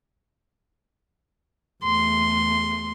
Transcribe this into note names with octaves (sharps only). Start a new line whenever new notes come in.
E2 A3 C6